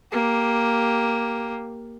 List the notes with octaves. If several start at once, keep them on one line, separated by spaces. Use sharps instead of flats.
A#3 G4